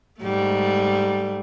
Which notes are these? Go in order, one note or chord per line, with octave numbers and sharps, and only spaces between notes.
G#2 G3 A3